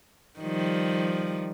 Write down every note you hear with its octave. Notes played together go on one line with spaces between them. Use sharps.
D#3 F3 G3